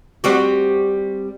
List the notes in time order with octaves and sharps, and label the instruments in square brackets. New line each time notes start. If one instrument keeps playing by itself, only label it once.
[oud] G3 C4 F#4